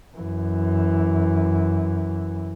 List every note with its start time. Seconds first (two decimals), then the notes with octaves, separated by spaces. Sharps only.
0.17 F#2 E3